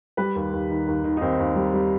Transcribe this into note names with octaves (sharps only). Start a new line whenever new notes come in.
G3 B4
D#2
D#2
D#3
D#2
D#3
D#4
D#2 C4
D#2
G3
G3